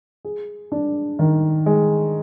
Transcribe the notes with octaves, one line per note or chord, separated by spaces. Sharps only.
G#4
D4
D#3
G#3